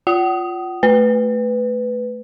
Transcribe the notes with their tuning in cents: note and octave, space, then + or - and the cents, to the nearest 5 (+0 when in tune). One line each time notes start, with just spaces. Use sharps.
F4 +0 F#5 +40 D#6 +0
A3 +0 B4 +10